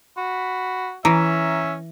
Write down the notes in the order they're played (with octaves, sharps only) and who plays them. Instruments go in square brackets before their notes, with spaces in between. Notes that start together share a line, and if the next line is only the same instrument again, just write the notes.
[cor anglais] F#4 [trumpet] B5
[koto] E3 [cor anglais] C#4 [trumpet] E5 [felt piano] A#5